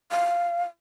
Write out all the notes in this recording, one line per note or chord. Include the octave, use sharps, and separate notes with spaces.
F5